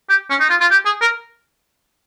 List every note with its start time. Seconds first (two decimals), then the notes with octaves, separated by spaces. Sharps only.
0.09 G4
0.30 C#4
0.40 D#4
0.49 F4
0.60 F4
0.71 G4
0.85 G#4
1.01 A#4